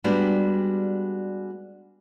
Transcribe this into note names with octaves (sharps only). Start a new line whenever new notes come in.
G3 G#3 B3 D4 F#4 G4